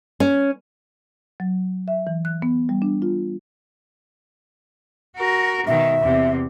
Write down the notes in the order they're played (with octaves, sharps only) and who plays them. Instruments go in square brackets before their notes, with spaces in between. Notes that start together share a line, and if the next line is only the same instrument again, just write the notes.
[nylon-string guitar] C#4
[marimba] F#3
E5
E3
F#6
B3
G3
D4
F4
[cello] F#4 A#4
[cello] B2 D#3 [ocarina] E5
[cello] E2 C3